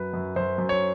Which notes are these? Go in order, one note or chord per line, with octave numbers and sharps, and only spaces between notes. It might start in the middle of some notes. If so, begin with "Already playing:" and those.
Already playing: F#2 F#3 B4
F#2
F#2 C5
F#2
C#5